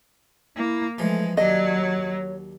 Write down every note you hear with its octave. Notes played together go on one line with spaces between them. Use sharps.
A#3 E4
E3 F3 G#3 A3
D#2 F#3 D4 D5 D#5
C#5